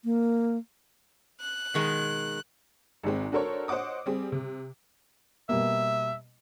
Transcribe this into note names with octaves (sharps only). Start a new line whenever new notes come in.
A#3
F#6
B2 D#3 G#3
G#1 G#2 G#3 C4
D4 F#4 A4 A#4 C5 C#5
C5 C#5 D#5 F#5 D6 D#6
G3 C4 G#4
C3
B2 G3 A#3 E5